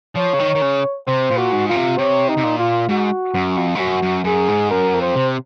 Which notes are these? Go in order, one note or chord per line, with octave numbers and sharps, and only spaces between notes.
F3 C#5
C#3
D#3
D#3
C#3
C3 C5
A#2
F#4
G#2
A#2 F4
C3
C3 C#5
D#4
C3
A#2
F4
G#2 F#4
F#2
F2
G#2
F#2 F#4
F#2
F#2 G#4
G#2
F#2 A#4
F2
C5
C3